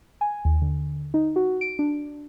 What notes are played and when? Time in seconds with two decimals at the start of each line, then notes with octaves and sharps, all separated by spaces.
0.21 G#5
0.45 D#2
0.62 D3
1.14 D#4
1.36 F#4
1.61 D7
1.79 D4